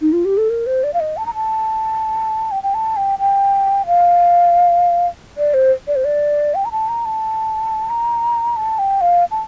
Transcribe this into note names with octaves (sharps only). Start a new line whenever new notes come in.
D#4
F4
G4
A4
A#4
C5
D5
F5
D#5
A5
A#5
A5
G5
G5
A5
G5
G5
F5
D5
C5
D5
C5
D5
G5
A#5
A5
A#5
A5
A#5
A5
G5
F5
A5